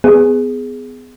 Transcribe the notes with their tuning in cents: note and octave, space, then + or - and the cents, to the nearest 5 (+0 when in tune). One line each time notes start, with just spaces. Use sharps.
B3 +25 G#4 +0